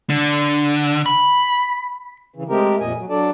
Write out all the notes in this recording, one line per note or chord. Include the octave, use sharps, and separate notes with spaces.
D3
B5
C#3 E3
G#3 A3 C4 G4 A#4
F2 A#2 D#5 G#5
F#3
F#3 D4 A4 D5 A5